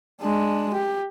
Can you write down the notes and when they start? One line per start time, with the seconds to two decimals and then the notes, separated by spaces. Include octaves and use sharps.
0.21 G#3 D4
0.74 G4